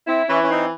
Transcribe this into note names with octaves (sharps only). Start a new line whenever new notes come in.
C4 E4
E3 C#4
C#4
C4 D#4